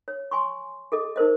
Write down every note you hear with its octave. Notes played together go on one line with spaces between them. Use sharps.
C#5
G#5 C6 C#6
G#4 A4 D#5
D#4 A#4 C5 D#5